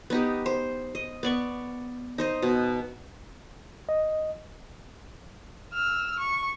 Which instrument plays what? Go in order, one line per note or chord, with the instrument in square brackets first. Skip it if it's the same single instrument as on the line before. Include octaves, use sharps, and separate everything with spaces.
[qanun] B3 D#4 G4
C5
D#5
B3 D5 C#6
D#4 C5 D#5
B2
[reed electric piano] D#5
[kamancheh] E6 F6
C#6